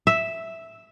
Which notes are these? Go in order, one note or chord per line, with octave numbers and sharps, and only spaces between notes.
E5